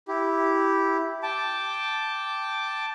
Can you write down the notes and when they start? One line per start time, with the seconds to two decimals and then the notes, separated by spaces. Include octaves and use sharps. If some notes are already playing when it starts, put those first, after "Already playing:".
0.08 E4 G4
1.23 G5 A5 D6